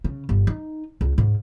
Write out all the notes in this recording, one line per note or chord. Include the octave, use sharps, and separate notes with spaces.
C#3
G1
D#4
C#2
G#2